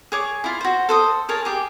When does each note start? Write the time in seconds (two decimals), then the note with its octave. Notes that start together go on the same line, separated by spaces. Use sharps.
0.12 G#4 C#5 D6
0.44 E4 F4
0.61 F#4 C5
0.89 A4 C5 D#6
1.29 G#4 A#4 C#5 A5
1.45 G4 G#4